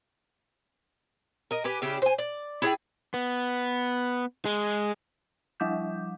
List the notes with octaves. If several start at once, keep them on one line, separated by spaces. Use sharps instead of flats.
A#4 D#5
G4 B4 G#5
C#3 D4 E4 G4
C5 G#5
D5
E4 G#4 D5 G5
B3
G#3
F3 G3 D6 G6